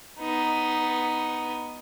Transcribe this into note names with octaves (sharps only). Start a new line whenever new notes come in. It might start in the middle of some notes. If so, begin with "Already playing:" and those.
B3 D#4